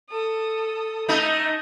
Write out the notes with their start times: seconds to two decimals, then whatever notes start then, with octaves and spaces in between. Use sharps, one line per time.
0.10 A4 D#6
1.09 A3 D#4 D#5